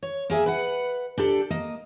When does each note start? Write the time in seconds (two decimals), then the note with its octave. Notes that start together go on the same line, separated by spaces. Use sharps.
0.03 C#5
0.30 A#3 G#4 E5
0.46 B4 F#5
1.18 D4 G4 A4
1.50 A#3 D#5